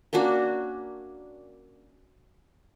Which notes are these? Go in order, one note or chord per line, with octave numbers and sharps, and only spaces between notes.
A#3 C#4 D4 F#4